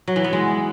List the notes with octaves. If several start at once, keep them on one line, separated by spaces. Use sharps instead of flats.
F#3
E3
B3
G#3